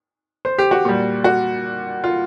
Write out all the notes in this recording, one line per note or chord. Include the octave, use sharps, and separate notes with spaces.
C5
G4
F#4
A#2 G3
F#4
F4